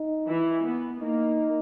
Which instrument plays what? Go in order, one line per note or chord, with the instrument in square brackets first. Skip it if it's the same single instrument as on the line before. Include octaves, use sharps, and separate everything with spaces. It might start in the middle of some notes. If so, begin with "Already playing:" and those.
Already playing: [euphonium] D#4
[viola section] E3 E4
B3
[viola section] A#3 [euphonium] D#4